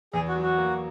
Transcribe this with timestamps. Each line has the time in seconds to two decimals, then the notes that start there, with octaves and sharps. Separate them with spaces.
0.13 E2 G#4
0.28 F#4
0.36 F#3
0.42 F#4
0.57 A#3